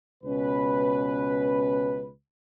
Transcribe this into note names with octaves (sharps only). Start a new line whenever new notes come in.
C#2 B2 C#4 B4